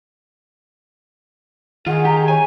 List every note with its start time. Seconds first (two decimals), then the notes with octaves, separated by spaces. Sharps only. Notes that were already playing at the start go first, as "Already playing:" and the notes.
1.86 D#3 F4 G#4 F#5
2.05 G4 A#5
2.28 C#5 G#5